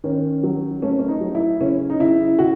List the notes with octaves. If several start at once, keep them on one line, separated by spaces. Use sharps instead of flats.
D#3 C#4
F#3
A3 C#4
C#4
D#4
F#3
E4
C#3 C#4
D#4
C#3 E4
C#3 F#4